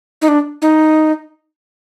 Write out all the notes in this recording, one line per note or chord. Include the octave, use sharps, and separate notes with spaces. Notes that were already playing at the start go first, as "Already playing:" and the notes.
D#4
D4
D#4